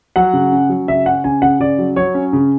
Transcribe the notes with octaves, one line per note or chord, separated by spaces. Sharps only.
F#3 F#5
C#3
C#4
F#3
C#3 E5
C#4 F#5
C#3 G#5
C#3 F#5
C#3 D5
F#3
F#3 C#5
C#4
C#3